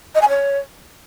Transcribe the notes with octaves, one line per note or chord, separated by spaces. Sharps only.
D#5
G#5
C#5